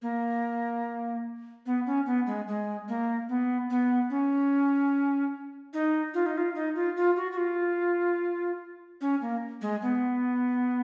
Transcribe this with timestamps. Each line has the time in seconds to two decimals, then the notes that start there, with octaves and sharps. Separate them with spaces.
0.02 A#3
1.66 B3
1.86 C#4
2.06 B3
2.27 G#3
2.48 G#3
2.88 A#3
3.29 B3
3.70 B3
4.10 C#4
5.74 D#4
6.14 F4
6.26 D#4
6.38 F4
6.55 D#4
6.76 F4
6.96 F4
7.17 F#4
7.32 F#4
7.37 F4
9.01 C#4
9.21 A#3
9.62 G#3
9.82 B3